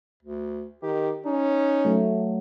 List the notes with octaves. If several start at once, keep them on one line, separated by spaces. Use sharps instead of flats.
D2
D#3 G4
C#4 D#4
F#3 A3